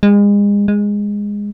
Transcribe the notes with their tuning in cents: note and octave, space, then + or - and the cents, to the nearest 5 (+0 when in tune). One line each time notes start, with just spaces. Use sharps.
G#3 -35
G#3 -15